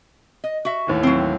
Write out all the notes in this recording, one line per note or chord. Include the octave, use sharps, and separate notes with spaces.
D#5
F#4 E5
D#2 A2 E3
F#3 C4